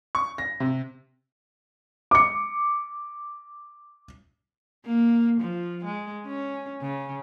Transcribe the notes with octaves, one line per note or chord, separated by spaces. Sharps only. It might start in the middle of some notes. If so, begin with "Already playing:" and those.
C#6
A#6
C3
D6 C#7
A#3
F3
G#3
C#4
C#3